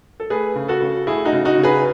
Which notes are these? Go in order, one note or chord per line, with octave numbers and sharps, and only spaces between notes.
A4
A3 G#4 B4
C#3
F#4 A4
C#3
A3 E4 G#4
D#4 F#4
C#3
D#4 F#4
C#3
G#4 B4